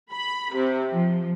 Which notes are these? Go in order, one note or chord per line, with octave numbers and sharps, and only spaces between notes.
B5
C3
F3